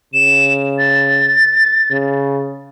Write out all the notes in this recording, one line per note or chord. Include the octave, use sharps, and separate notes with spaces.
C#3 E7
A6
C#3